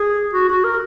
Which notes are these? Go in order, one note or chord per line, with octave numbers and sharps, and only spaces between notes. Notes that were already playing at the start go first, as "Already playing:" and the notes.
Already playing: G#4
F#4
F#4
A#4